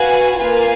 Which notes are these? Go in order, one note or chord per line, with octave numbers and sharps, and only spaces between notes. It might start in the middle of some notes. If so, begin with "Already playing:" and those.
Already playing: F#4 B4 F5 G#5
A#3 F4 B4 F5 G#5